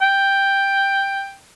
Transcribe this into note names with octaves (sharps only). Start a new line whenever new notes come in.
G5